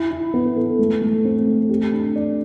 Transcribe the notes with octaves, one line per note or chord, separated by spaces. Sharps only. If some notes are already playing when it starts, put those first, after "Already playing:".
Already playing: E4
E4
B3
A4
A3
A3
C4
A3
G4
D4
D5